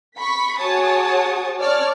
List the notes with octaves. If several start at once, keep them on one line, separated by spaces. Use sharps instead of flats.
B5 C#6 B6
F#4 G#4 C#5 A5 C#6 D#6
C#5 D5 A5 F6